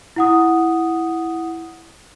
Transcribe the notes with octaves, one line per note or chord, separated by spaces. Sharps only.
E4 F#5 D#6